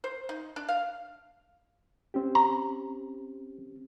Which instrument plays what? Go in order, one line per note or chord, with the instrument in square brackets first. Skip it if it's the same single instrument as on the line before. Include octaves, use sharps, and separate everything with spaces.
[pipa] C5
D#4
D4
F5
[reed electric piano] C4 C#4 G4
[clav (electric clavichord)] A#5